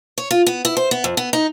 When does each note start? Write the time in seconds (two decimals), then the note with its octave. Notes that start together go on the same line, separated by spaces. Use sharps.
0.18 C#5
0.31 F4
0.46 B3
0.65 E4
0.77 C5
0.91 B3
1.04 F2
1.17 B3
1.33 D#4